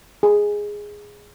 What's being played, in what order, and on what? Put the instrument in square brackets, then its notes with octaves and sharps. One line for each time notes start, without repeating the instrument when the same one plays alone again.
[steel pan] G#4